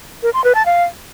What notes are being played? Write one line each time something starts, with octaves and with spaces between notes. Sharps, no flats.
A#4
C6
B4
A5
F5